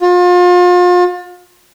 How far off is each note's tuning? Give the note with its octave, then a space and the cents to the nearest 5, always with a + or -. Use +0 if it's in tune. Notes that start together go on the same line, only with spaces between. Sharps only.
F4 +35